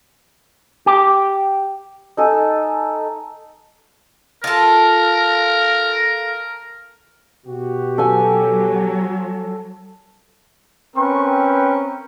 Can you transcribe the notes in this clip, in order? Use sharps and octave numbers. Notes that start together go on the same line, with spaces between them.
G4
D#4 A4 G#5
F4 A4 A#4
B2 F#4 G4
F#3 A4 G#5
C4 C#4 A#4 B4 G5 C#6